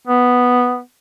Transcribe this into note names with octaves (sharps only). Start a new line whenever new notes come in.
B3